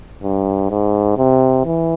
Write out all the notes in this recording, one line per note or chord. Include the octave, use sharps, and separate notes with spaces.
G2
G#2
C3
E3